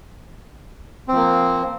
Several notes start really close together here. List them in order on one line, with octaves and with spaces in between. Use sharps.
C4 F3 A#3